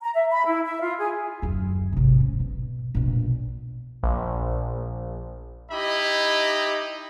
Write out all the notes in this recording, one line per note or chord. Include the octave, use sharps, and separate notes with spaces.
A#5
E5
B5
E4
E5
F4
G#4
F#1 D#2
G#1 C3
C#3
B2
A#1 B2
A#1
D#4 E4 G4 D#5 B5